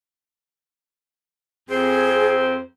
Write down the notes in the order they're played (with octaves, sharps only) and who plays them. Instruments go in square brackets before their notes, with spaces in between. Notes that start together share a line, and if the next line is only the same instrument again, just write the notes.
[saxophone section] F2 C4 C5 [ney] G#4